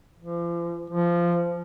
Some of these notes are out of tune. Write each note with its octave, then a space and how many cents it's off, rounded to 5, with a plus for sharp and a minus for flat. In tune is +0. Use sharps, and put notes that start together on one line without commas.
F3 -40
F3 -15